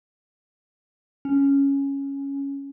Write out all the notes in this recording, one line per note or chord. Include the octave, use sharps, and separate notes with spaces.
C#4